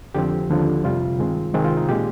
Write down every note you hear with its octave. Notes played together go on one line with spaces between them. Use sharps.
F2 D3 F3 C4 G4
D#2 D3 F3
F2 C3 G3 F4
G2 D#3 G#3 C4
C2 C3 D#3 G#3 C4
F4
D#4
A#2 G#3 G4